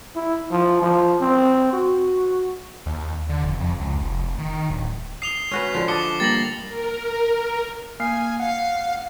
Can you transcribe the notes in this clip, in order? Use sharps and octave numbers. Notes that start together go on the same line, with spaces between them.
E4
F3
F3
C4
F#4
D#2
D3
F1
F2
C#2
F1
D#3
D1
D#6 C7 F7 G7
C#4 F#4 B4
D3 F3 F5
D#5 A5 D6 D#6 C#7 G7
G3 A#3 A6 A#6 F#7
A#4
A#3 G#5 F6 C7
F5 F#5